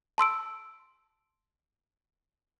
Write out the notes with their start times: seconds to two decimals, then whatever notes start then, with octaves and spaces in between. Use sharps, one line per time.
0.18 A5 C6 E6 D7